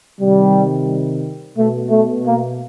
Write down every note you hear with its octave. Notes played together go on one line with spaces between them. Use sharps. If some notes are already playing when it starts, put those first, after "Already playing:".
C3 D#3 G3
B2 A3
A3
A#3